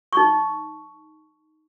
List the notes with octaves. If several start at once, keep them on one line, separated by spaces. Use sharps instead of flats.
D#4 C#6